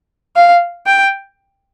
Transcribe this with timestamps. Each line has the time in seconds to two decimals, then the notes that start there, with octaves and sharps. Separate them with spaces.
0.36 F5
0.87 G5